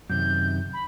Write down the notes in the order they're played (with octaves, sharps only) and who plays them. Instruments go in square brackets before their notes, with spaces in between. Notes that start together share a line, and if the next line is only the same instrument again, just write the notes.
[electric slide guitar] F#2 C3 D#3 [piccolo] G6
[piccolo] B5